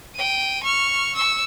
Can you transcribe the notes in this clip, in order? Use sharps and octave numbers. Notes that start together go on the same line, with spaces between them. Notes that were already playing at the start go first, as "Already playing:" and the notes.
G5 D#7
C#6 F6
C#6 E6